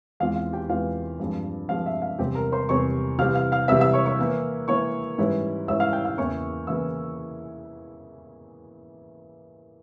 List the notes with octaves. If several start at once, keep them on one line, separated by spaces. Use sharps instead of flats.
E2 E3 G#3 C4 F4 F5
F5
G4 G5
E2 E3 G#3 C4 F4 F5
G2 F3 G#3 C4
G2 F3 G#3 C4 F5
E5
F5
E2 C3 G3 C4 G4 G5
A#4 A#5
C5 C6
E2 C3 G3 C4 C#5 C#6
C3 E3 G3 C4 F5 F6
F5 F6
F5 F6
C3 E3 G3 C4 E5 E6
E5 E6
C#5 C#6
C#5 C#6
E3 A#3 E4
E3 A#3 E4 C#5 C#6
G#2 E3 G3 C#4 E4
G#2 E3 G3 C#4 E4 E5 E6
F5 F6
G5 G6
F5 F6
E2 C#3 E3 A#3 E4 C#5 C#6
E2 C#3 E3 A#3 E4 E5 E6